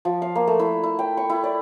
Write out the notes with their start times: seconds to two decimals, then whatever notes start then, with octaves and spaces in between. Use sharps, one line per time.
0.05 F3
0.22 F5
0.35 A#3
0.47 A3
0.60 E4
0.84 E4
0.99 G5
1.17 C#6
1.30 E4
1.44 D5